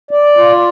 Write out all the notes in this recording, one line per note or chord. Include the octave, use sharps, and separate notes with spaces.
D5
F4